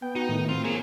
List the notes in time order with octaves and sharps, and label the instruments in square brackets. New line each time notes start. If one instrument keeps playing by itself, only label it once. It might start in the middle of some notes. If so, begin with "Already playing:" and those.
[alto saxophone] B3 [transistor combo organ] G5
[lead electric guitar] D#4 [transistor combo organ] F#4
[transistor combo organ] A2 D#3
[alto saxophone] C4 [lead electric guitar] F4
[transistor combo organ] A#3 G#4 [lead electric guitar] C#5 A#5